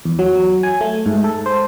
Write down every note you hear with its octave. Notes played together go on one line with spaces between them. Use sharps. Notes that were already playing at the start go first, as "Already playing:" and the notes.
E2
F#3
G#5
A3
G#2
A4
C5